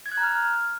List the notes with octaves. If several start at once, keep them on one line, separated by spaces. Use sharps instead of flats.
G#6
F#6
A#5
F6